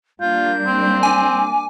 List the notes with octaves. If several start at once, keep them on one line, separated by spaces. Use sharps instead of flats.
G3 A#3 D4 F4 G6
C4
G#5 D6